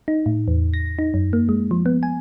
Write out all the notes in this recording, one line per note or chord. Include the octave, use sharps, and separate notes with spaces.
D#4
A2
E2
A#6
D#4
F#2
A#3
G#3
F3
B3
G#5